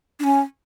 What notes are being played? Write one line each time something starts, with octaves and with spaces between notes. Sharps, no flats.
D4
C#4